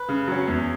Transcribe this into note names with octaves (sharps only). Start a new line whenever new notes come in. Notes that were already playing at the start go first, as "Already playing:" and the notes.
Already playing: B4
C#3
F#3 C#4
E2